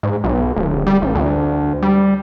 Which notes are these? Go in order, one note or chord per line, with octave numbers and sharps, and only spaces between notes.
G#2
B1
D1
G3
A1
D2
G3